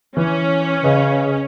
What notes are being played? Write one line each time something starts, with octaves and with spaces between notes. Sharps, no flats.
E3 C#4
C#3 B4 D#5